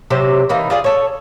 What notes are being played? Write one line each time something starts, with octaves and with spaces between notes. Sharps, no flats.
C3 F#3 G4 C5
E3 A#3 D#4
F4 G#4 D5
A4 C#5